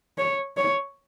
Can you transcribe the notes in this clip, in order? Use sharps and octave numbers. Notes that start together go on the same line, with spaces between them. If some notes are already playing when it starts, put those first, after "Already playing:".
C#5
C#5